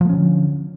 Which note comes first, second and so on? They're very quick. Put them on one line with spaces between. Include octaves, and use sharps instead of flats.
F3 A3 C#4 D3